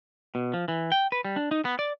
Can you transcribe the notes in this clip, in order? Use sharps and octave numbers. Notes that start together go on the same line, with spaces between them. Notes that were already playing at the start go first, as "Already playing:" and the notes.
B2
F3
E3
G5
B4
G3
D4
D#4
B3
D5